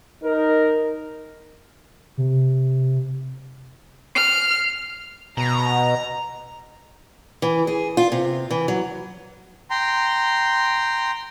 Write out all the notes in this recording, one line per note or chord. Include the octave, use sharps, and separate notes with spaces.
D#4 A#4
C3
F6 C7
B2 A#5
E3
G#4
F4
C3
E3
F#3
G5 A#5 C6